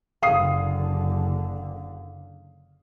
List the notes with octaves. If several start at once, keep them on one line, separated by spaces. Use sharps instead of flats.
F#1 D3 F5 D#6 C7